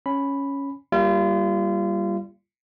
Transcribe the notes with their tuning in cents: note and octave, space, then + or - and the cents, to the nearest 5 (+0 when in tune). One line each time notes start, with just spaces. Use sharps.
C#4 +0 B5 +0
G3 +0 A#3 +10 F4 -35